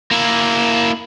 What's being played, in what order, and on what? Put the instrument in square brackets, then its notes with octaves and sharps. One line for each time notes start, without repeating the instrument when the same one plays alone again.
[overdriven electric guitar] A#3 E4